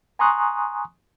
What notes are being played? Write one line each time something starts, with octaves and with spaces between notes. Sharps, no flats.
G#5 A#5 C6 C#6 D#6 F#6